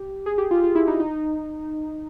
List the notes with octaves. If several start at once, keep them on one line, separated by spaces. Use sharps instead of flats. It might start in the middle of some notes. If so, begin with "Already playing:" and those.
Already playing: G4
G#4
G4
F4
F4
E4
D#4
D#4